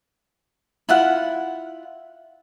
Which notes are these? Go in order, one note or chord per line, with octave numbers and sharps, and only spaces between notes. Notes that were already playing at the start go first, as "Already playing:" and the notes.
E4 F4 F#5